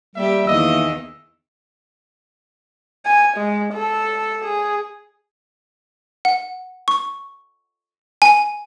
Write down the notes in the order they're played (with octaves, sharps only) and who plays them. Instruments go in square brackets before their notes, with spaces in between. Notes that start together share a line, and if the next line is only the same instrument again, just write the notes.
[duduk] G3 [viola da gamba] A#3 G4 [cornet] E5
[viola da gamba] E2 D#3 E3 [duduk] A#3 [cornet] D#5 [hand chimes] E6
[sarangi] G#5
G#3
A4
G#4
[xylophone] F#5
C#6
G#5